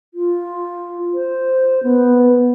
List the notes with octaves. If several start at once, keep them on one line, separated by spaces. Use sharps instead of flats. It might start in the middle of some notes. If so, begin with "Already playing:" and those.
F4
C5
B3